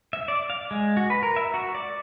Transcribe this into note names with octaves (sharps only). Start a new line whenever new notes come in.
E5
D5
F5
G#3
F#4
B4
A#4
E5
F#4
D5